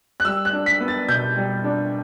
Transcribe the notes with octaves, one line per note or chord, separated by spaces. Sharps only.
F#6
G3 E6
F#6
D4
B6
B3
A6
B2 G6
G3
D4